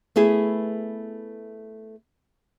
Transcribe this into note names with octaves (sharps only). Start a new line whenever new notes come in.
A3 B3 E4 G#4